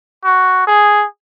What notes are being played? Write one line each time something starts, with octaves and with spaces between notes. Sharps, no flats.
F#4
G#4